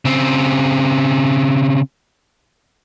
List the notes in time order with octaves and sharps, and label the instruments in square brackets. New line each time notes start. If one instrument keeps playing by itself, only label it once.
[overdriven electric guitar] C#3 C4